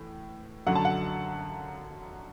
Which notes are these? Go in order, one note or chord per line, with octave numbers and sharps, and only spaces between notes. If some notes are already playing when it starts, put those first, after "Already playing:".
Already playing: A2 E3
F#2 D3 F#3 F#5
A5
F#5